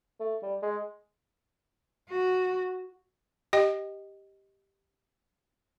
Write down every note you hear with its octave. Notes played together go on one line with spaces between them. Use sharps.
A3
G3
G#3
F#4
G4 D#5 G5